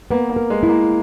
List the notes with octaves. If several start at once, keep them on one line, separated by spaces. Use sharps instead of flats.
A#3 B3
A#3
A#4
G#3
E4
A#3